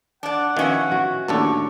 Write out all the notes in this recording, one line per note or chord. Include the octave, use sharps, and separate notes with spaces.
D4 D5 F#5
B2 D#3 F3 C#4 E4
F#4
A1 D#2 A2 D4 A4 C#5